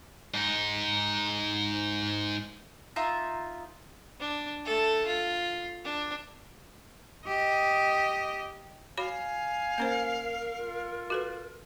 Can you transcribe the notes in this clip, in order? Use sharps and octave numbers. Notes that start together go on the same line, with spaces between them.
G#2 D#4
D#4 F4 E5 A#5
D4
A3 A4
F4
D4
G4 D#5
F#4 C#5 F5 G#5 B5
A#3 C#4 A#4 C5
F4
F#4 A4 B4